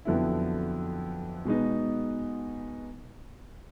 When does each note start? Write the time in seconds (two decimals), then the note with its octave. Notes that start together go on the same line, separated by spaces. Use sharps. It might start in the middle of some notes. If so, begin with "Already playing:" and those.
0.05 F2 D3 F#3 B3 E4
1.45 B2 G#3 B3 D#4